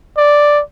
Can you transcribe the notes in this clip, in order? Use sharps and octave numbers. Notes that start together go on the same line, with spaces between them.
D5